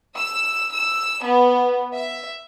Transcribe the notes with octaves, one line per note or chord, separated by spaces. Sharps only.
E6
E6
B3
E5